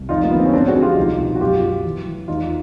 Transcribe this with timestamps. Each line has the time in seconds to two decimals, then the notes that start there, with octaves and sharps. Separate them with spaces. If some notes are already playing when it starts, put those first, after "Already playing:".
Already playing: C2
0.09 F2 D#4 F4
0.24 A#3
0.31 D3 B3
0.39 C4
0.45 C#4
0.53 G#2 C4 D4
0.68 F#4 G#4
0.75 F3
0.82 F4 G4
0.96 C2 D#4 F4
1.19 B2
1.35 F#4
1.40 F#2 F4 G4
1.63 F#2
1.85 E3
2.06 E3
2.28 E2 D#4 F4